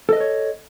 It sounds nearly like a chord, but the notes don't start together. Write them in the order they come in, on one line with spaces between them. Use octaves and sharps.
A4 D#5 B4 C#5